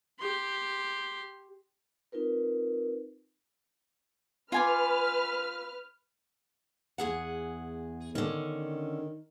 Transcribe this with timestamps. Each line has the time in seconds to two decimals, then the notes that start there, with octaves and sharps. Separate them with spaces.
0.19 G4 C6
2.12 C4 D#4 F4 A#4 B4
4.52 F4 B4 G#5 D6 F6
6.98 E2 G#4 F#5
8.15 D3 D#3 C#4